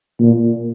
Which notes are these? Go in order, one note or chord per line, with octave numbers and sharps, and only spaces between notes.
A#2